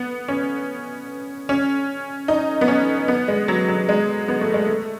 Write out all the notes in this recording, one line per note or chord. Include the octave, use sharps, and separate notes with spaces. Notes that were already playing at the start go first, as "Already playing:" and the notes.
Already playing: B3
C#4
C#4
D#4
B3
C#4
B3
G#3
F#3
F#3
G#3
B3
A3
G#3
A3